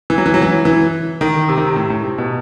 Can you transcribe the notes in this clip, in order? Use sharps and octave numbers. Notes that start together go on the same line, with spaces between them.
E3
F#3
E3
F#3
E3
E3
D#3
C3
D#3
C3
A2
A2
C3
B2